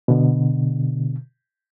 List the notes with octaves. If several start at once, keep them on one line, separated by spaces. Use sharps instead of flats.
B2 D3